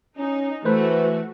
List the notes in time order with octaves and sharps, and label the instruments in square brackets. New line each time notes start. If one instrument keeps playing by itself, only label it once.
[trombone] C#4 [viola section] D#4
[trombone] E3 [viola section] A3 F#4 [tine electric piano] B4 C5